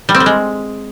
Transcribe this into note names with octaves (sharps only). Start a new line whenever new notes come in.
G3
C4
G3
G#3